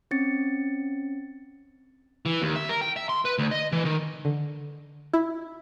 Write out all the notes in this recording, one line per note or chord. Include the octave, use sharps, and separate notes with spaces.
C4 C#4 A6 C#7
E3
D#2
E5
A#4
G5
E5
C6
B4
D2
D#5
E3
D#3
D3
E4